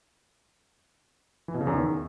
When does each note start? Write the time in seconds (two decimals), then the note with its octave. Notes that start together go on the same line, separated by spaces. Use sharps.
1.48 E3
1.54 B2
1.61 C#3
1.67 E2
1.73 D#3